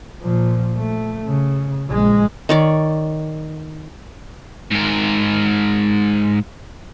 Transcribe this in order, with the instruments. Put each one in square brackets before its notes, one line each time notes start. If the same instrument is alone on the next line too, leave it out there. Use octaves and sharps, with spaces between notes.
[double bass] A#2 F3
A3
C#3
A#1 G#3
[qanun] D#3 C#5 D5
[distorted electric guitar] G#2 A#4